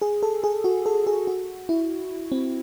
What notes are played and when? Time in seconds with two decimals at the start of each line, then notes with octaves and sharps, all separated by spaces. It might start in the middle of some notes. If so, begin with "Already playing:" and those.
0.02 G#4
0.23 A4
0.44 G#4
0.64 F#4
0.86 A4
1.07 G#4
1.27 F#4
1.69 E4
2.32 C4